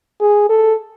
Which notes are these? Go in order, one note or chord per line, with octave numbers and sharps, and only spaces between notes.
G#4
A4